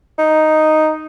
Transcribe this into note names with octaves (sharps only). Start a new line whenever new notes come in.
D#4